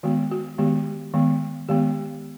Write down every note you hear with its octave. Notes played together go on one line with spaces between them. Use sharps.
D#3 G#3 B3 F#4
F#4
D#3 G#3 B3 G4
D#3 G#3 B3
D#3 G#3 B3 G4